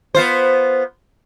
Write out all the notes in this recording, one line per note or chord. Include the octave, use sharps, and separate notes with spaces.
B3 F4 C5